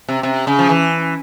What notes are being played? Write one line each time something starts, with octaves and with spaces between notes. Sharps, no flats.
C3
C3
C#3
F3
E3